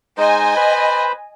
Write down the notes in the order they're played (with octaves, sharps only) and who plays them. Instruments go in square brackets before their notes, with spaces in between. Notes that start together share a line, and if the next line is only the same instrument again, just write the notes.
[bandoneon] G#3 D#4 C5 [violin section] D#5 G#5
[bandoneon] B4 C5 B5